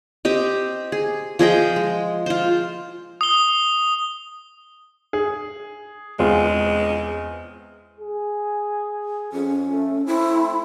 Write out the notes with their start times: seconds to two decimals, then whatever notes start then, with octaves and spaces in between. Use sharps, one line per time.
0.25 C4 G4 D#5
0.92 G#4
1.39 F3 G#4 D#5 G5
1.76 G#3
2.26 F4 C5
3.21 D#6 G7
5.13 G#4
6.19 E2 G#3 C4 F4
7.99 G#4
9.32 F2 C#4
9.71 A3
10.06 A3 C4 E4